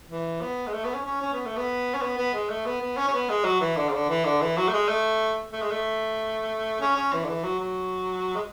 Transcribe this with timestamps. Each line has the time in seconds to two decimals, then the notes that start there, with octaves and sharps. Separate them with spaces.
0.10 E3
0.41 B3
0.67 G#3
0.73 A3
0.85 B3
0.95 C#4
1.06 C#4
1.22 C#4
1.33 B3
1.45 A3
1.57 B3
1.94 C#4
2.02 B3
2.18 B3
2.33 G#3
2.49 A3
2.66 B3
2.81 B3
2.97 C#4
3.08 C#4
3.14 B3
3.29 G#3
3.45 F#3
3.61 E3
3.77 D3
3.89 C#3
3.93 D3
4.09 E3
4.25 D3
4.41 E3
4.57 F#3
4.68 A3
4.73 G#3
4.88 A3
5.53 A3
5.62 G#3
5.71 A3
6.81 C#4
6.96 C#4
7.13 E3
7.24 D3
7.28 E3
7.44 F#3
7.60 F#3
8.36 G#3